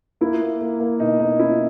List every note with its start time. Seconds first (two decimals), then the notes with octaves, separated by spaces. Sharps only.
0.21 A#3 E4
0.41 A#3
0.61 A#3
0.80 A#3
1.00 B2 D#4
1.20 A#3 D#4
1.39 C#4 E4